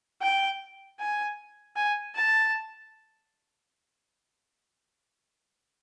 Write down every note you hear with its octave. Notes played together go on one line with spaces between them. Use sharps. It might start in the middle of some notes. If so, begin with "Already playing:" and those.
G5
G#5
G#5
A5